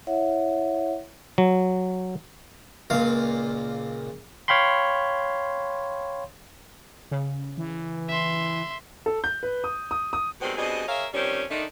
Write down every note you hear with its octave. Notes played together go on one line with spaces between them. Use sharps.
E4 C#5 E5 F#5
F#3
C#2 A#2 F5
C#5 F5 G5 B5 C6
C#3
E3
E5 C6
A4
G6
B4
D#6
D#6
D#6
B2 D#3 G3 G#3 C4
B2 G3 C4 D4 G#4 D#5
G#4 A#4 C#5 E5 F5
D#3 F3 G3 C4 C#4
D3 D#3 A3 D4 D#4